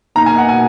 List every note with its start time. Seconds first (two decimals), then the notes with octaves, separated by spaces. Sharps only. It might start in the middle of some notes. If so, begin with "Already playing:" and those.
0.15 B2 A#3 D#4 A#5
0.26 G#5
0.38 F#5
0.49 G#5